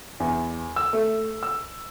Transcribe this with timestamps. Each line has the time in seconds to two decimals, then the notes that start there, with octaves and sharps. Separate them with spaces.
0.20 E2
0.76 E6
0.93 A3
1.43 E6